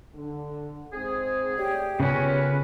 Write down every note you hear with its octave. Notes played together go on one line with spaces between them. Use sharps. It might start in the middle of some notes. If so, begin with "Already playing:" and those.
D3
G#2 C4 G#4
A3 G4 C#5 D5
C#3 B3 C#4 F4 G#4 A#4 B4 C#5